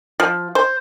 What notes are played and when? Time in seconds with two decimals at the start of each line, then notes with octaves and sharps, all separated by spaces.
0.20 F3
0.55 C5